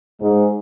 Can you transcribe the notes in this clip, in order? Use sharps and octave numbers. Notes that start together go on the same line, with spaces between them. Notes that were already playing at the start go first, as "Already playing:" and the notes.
G#2